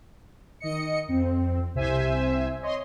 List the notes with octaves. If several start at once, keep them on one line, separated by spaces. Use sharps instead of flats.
D#3 D#5 C#7
F2 C4
C2 C3 C5 E5 G#5
C#5 D#5 C6